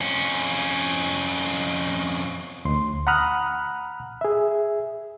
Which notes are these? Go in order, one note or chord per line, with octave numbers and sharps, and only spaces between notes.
F2 C#4
D2 C6
F#5 A#5 B5 D#6 F6 F#6
G#4 E5